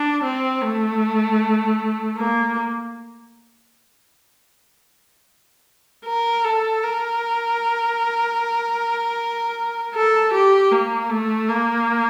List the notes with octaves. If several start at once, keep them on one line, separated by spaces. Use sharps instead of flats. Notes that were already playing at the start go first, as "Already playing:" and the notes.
Already playing: D4
C4
A3
A#3
A#4
A4
A#4
A4
G4
A#3
A3
A#3